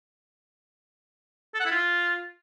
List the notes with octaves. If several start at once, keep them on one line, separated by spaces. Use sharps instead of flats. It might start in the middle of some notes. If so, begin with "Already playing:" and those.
A4
F#5
E4
F4